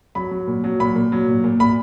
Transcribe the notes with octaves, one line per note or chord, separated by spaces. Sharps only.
F#3 B5
F#3
A#2
F#3
A#2 B5
A#2
F#3
A#2
A#2
A#2 B5